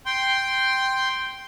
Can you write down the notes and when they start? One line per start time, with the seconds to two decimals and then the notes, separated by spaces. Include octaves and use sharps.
0.06 G5 C6